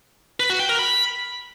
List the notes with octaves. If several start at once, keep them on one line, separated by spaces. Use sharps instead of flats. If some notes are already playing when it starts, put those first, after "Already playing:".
B4
F#4
G5
A#4
B5